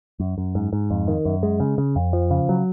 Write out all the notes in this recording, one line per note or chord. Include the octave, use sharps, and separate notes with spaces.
F#2
F#2
G#2
G#2
F2
D#3
F#2
G#3
C#3
C#3
F2
F3
C#3
F#3